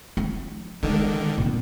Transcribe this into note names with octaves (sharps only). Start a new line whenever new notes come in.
F3 D#4
D3 D#3 G#3
A#2 C4